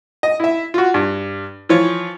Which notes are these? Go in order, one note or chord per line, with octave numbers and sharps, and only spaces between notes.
D#5
E4 E5
F4 F#4
G2
E3 F3 F4 C#5